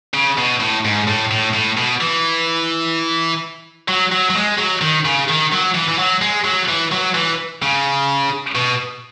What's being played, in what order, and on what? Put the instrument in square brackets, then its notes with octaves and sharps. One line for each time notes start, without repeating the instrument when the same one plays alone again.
[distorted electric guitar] C#3
B2
A2
G#2
A2
A2
A2
B2
E3
F#3
F#3
F#3
G#3
F#3
D#3
C#3
D#3
F#3
E3
E3
F#3
G#3
F#3
E3
F#3
E3
C#3
B2